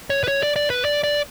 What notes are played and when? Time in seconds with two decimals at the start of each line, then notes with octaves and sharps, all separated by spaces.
0.10 C#5
0.24 B4
0.28 C#5
0.43 D5
0.56 D5
0.70 B4
0.85 D5
1.04 D5